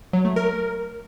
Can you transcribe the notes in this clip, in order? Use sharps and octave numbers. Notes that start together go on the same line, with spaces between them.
F#3
A3
A#4